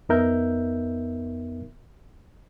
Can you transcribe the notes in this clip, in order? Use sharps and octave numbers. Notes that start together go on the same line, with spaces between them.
F2 B3 D#4 A#4 E5 G6